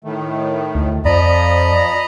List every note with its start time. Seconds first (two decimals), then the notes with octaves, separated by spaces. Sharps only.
0.04 A2 D#3 A3
0.75 D2
1.05 F2 F3 D5 D#5 A#5 B5